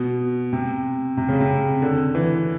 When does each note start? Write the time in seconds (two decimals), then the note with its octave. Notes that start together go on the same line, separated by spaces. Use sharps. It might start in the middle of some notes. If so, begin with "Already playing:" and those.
Already playing: B2
0.53 C3
1.17 C3
1.29 C#3
1.40 C3
1.82 D3
2.15 E3